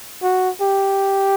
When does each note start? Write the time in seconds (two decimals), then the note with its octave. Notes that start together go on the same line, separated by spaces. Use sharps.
0.23 F#4
0.61 G4